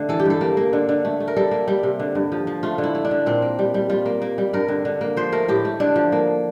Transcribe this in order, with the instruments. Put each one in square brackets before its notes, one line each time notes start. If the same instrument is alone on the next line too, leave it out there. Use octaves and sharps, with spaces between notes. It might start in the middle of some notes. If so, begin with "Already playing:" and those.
Already playing: [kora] D3 A3
E3 A4
G4
G2 A4
A#3
A#3
D3
D3
A3
A3
A#4
G3 A4
A#3
G3
C3
D3
G2
F3
F3
A3 F4
D3
E4
A3
D4
D3
A#2 C4
A#3
G3
G3
G3 F4
A#3
A#3
G3
G2 A#4
D3
D3
A#3
F3 C5
A3 A#4
A2 G4
A3
D3 D4
F3
A#3